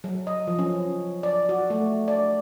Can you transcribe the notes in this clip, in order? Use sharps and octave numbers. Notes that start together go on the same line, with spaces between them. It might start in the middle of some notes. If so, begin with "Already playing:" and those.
F#3
D#5
F3
C#4
D5
F#4
A3
D5